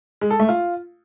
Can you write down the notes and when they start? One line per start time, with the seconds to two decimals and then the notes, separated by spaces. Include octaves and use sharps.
0.21 G#3
0.30 A4
0.40 A3
0.49 F4